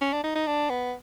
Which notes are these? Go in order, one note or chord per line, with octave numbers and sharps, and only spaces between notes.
C#4
D4
D#4
D#4
D4
B3